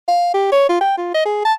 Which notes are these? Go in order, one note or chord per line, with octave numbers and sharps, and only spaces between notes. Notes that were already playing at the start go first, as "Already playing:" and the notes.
F5
G4
C#5
F4
G5
F4
D#5
G#4
A5